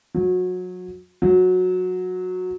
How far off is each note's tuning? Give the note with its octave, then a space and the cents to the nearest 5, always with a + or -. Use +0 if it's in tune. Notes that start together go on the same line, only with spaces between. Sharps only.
F#3 -25
F#3 -15